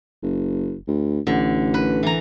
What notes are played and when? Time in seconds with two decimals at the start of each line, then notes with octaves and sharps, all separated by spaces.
0.23 F#1
0.88 D2
1.27 A1 D3
1.74 B4
2.03 E3 A#5